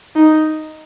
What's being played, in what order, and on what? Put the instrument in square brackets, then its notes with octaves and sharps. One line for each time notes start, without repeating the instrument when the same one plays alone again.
[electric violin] D#4